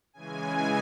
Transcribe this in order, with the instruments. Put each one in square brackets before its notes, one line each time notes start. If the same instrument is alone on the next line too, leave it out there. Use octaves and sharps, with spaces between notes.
[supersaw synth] C#3 E3 G#3 G#5